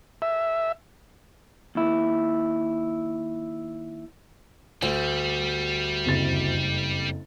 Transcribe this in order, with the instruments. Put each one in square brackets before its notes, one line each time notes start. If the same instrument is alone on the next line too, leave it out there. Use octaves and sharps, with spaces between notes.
[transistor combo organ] E5
[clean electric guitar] D#2 E4
[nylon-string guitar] D2 [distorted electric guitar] G3
[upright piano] F#1 F2 A6